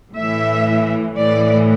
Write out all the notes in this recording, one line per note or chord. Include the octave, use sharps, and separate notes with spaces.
A2 E3 E5
A2 E3 D5